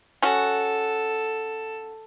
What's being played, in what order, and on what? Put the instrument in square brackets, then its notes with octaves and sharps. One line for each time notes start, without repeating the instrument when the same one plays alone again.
[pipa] C#4 F#4 [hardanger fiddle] A4